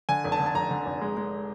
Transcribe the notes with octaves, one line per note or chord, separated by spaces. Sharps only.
D3 G#5
F1
A5
D3
A5
F1 A#5
D3
F1
G#3
G#3